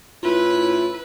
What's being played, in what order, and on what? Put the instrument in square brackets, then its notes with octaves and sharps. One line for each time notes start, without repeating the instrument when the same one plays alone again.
[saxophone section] A2 C#4 E4 [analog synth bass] F4 [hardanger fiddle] B4